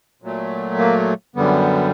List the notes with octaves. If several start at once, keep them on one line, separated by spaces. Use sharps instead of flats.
A#2 F#3 A3
A#3
F#2 D3 G3 B3